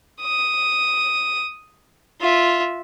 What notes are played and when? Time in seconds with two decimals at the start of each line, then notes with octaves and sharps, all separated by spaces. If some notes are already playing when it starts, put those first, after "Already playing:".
0.21 D#6
2.21 F4 E5